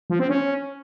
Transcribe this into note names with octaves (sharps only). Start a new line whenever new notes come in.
F3
C4
C#4